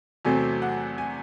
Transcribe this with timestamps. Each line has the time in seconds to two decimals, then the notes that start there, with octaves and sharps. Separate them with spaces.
0.25 E2 C3 F#3 A3 C4 G#5
0.62 F#5
0.98 G#5